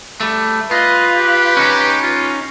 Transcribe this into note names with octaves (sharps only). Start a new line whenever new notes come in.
G3 A3
F4 B4 D#5
G4
C#4 D#4
F4